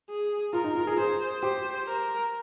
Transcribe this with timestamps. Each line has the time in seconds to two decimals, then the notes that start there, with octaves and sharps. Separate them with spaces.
0.09 G#4
0.53 F4 A#4
0.64 D#4
0.75 F4
0.87 G#4
0.98 G#4 C5
1.42 G4 C5
1.87 A#4